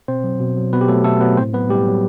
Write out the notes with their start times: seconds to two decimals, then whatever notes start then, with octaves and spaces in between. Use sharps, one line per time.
0.08 B2 C4 C5
0.24 F#3
0.40 B2
0.57 F#3
0.73 B2 B3 B4
0.81 G4
0.88 F#3 A3 A4
1.04 B2 A3 A4
1.21 F#3 B3 B4
1.37 A2 C4 C5
1.53 F#3 B3 B4
1.69 A2 G3 G4
1.87 F#3